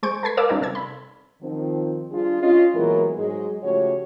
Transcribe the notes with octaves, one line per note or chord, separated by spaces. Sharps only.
G#3 C5 G#5 C#6 G6 D7
A4 B4 G#6 B6
A#4 B4 F5 A5 D6 E6
G3 C#4 D#4 A#4 D5 F5
C3 A4 E6 G#6
B5
D#3 F3 C4
G3 D4 F4 G#4
C#4 F4 D#5
A#2 E3 F#3 G#3 B3 A#4
G#2 F#3 G#3
C#3 F3 A3 F#4 G4 C#5